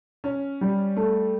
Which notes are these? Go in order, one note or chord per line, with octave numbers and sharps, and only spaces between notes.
C#4
G3
A3